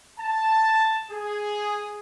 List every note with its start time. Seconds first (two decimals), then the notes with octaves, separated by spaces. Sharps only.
0.19 A5
1.11 G#4